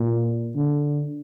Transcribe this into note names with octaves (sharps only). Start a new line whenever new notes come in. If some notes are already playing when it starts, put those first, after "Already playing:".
Already playing: A#2
D3